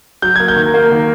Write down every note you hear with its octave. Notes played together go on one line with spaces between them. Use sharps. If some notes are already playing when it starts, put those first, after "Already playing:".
F#3 G6
A#3 G#6
G6
D#3
A#3
D#3